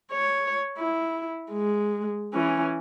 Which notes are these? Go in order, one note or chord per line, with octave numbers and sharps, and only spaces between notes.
C#5
E4
G#3
E3 C#4